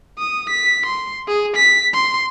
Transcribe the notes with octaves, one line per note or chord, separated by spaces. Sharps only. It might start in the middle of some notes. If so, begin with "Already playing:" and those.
D#6
B6
C6
G#4
B6
C6